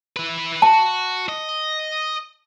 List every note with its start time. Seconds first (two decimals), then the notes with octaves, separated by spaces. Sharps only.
0.16 E4 B4
0.62 F#4 A5
1.29 D#5